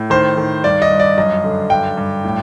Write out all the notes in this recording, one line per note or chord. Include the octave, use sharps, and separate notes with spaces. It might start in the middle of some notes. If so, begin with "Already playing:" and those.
Already playing: A2
D#3 C5
D#3
G2 D5
D#5
G2
D5
F#2 D#5
D3
G2 G5
G2
A2